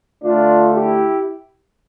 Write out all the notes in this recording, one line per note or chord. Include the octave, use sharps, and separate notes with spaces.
D3 A3 D4 F4
E4 G4